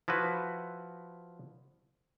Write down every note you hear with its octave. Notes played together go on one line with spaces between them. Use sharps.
F3 E4 F#4 B4